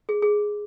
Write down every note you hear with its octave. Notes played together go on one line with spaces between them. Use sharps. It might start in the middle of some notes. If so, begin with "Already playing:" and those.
G#4
G#4